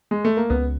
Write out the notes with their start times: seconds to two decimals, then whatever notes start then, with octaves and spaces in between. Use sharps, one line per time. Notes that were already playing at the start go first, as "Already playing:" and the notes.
0.11 G#3
0.25 A3
0.37 A#3
0.50 C#2 B3